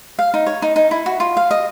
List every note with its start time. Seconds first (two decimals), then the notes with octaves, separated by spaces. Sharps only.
0.19 F5
0.34 D#4
0.47 C#5
0.62 D#4
0.76 D#4
0.91 E4
1.06 F#4
1.20 F4
1.37 F5
1.51 D#5